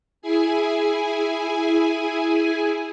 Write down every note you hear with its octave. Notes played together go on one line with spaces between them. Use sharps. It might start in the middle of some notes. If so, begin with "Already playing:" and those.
E4 G#4 G#5